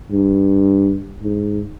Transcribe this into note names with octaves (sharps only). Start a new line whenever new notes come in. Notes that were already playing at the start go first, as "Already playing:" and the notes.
G2
G#2